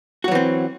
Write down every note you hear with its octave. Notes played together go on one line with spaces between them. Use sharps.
E3 F#3 C4 F#4